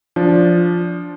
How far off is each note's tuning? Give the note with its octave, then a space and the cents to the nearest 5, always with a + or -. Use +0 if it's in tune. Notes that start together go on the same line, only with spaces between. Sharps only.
F3 +0 D4 -15